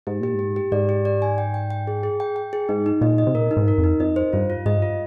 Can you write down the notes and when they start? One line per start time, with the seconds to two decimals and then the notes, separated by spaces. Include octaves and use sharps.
0.07 G#2 G4
0.20 A#2 G4
0.34 G#2 G4
0.56 G4
0.72 G#2 D5
0.89 G4
1.05 D5
1.22 G#5
1.38 G5
1.54 G5
1.70 G5
1.87 G#4
2.03 G#4
2.20 G5
2.36 G5
2.53 G#4
2.69 G#2 D#4
2.86 D#4
3.01 A#2 D#5
3.18 D#5
3.27 C3
3.35 A#2 A#4
3.51 D#4
3.57 G#2
3.68 A#4
3.78 F2
3.84 D#4
4.00 F2 D#5
4.16 C5
4.33 G2 F4
4.50 F4
4.66 G#2 D#5
4.78 G2 F4